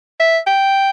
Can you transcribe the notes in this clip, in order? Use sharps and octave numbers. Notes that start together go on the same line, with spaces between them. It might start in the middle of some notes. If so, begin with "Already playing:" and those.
E5
G5